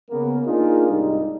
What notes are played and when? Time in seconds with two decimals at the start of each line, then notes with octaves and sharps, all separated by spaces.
0.10 C#3 A#3 B3
0.46 A#3 D4 D#4 F4 G#4 A#4
0.88 C2 G#2 G3 D#4